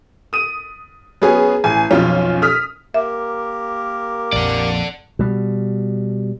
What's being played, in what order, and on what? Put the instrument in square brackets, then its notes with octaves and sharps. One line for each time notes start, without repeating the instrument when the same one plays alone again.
[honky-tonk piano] D#6 D#7
[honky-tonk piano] F#3 G#4 [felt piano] B3 C#4 G#5
[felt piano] A1 [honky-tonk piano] G#5
[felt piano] B1 F2 [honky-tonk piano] C#4 F4
[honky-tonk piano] D#6 F6 B6
[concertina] A#3 G4 A#4 [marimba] E5
[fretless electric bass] A#1 F2 [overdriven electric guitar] D5 F#5
[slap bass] B2 G3